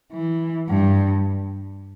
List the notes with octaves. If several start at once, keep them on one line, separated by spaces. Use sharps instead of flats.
E3
G2